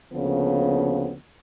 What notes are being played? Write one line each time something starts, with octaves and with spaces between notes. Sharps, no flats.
D2 C#3 F3 A#3 B3